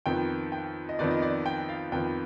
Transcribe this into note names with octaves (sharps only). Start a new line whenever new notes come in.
F2 D#3 B3 G5
G5
D#5
F2 D#3 B3 D5
D#5
D5
G5
F5
F2 D#3 B3 G5